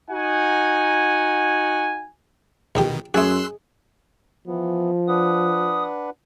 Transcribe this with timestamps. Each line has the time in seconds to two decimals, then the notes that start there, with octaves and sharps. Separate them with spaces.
0.11 D#4 F#4 F#5 G#5
2.75 A#1 B2 D3 D#3 G4
3.14 F#2 A3 F#4 G#4 C6 E6 F#6
4.47 E3 F3 B3
5.08 D4 B4 F#5 D#6